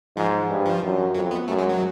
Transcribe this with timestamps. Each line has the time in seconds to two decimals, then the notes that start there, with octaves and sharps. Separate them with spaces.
0.16 G#2 F3
0.50 G2
0.66 F3
0.83 F#2
1.15 F2 F#3
1.31 B3
1.48 F#2 A3
1.58 G#3
1.69 F#3